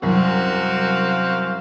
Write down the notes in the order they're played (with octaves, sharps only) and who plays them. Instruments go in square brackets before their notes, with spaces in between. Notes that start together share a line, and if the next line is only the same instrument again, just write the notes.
[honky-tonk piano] C2 F#2 [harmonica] C4 F#4 F5